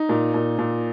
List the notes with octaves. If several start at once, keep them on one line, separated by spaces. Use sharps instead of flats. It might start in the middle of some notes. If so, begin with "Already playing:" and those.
Already playing: D#4
A#2
A#2
A#2